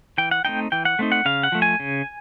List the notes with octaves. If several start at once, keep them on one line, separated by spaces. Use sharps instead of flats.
E3 G5
F#5
A3 C4 D#4 G5
E3 G5
F#5
A3 C4 D#4
F#5
C#3 F5
F#5
F3 A3
G#5
C#3